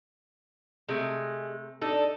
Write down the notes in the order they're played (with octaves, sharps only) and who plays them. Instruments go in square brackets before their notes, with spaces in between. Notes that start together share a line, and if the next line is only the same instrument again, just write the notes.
[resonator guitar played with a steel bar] C3 A3 [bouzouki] G#3
[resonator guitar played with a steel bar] D4 D#4 [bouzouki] A4